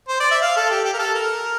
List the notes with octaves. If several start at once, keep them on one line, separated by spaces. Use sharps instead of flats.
C5
D5
E5
F5
A4
G4
G4
A#4
A4
A#4